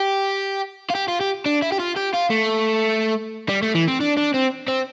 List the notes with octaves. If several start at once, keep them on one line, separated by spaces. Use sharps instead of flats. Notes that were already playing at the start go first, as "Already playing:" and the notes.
Already playing: G4
F4
G4
F4
G4
D4
E4
G4
F4
G4
F4
A3
G3
A3
E3
C4
D4
D4
C4
C4